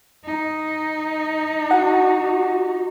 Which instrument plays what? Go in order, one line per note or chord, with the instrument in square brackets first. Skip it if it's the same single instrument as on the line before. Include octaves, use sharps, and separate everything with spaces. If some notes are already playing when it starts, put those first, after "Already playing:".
[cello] D#4
[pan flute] F#4 [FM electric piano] F#5